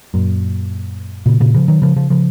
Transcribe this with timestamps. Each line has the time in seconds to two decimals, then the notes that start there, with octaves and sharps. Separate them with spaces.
0.14 F#2 A#2
1.26 A#2 C#3
1.40 A#2 C#3
1.54 C#3 F3
1.68 D#3 F#3
1.82 C#3 F3
1.96 C#3 F3
2.10 C#3 F3